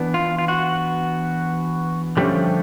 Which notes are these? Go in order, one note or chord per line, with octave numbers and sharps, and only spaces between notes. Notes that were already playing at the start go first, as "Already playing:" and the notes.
Already playing: E3 B3 D4
F4
F4
F#4
D3 F3 G3 A3 C#4 G4